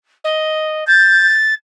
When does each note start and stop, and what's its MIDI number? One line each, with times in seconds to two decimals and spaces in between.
0.24 0.84 75
0.88 1.35 91
0.88 1.54 93